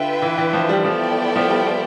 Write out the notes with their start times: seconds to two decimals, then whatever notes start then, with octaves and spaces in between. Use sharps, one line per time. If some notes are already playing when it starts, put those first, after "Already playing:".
Already playing: D3 F4 B4 E5 G5
0.22 E3
0.38 E3
0.53 F3
0.69 G3
0.84 F3 B3 E4 A4 D5 G5
1.36 F3
1.47 G3